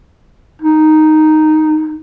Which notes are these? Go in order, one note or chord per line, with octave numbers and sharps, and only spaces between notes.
D#4